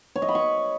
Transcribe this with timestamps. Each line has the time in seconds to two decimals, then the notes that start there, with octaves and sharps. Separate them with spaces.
0.16 C#5
0.22 D#5
0.28 B5
0.35 C#6